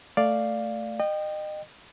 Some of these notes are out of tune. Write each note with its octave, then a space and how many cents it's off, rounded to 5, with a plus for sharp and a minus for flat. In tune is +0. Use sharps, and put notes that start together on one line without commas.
A3 +10 D5 +0 F5 +0
D#5 -30 G5 +0